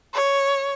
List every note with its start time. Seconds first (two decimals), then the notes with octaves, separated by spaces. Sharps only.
0.14 C#5